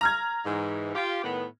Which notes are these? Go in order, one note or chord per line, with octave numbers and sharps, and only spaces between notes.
A#5 F6 G#6
G#2 E3
F4 G4
A2 D#3 B3